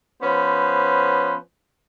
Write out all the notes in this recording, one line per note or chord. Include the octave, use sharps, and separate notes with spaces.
F3 B3 C#4 B4 C5